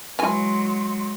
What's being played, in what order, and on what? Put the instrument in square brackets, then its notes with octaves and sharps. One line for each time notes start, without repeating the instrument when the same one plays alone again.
[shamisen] E3 G#5 [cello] F#3 G#3 [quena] C6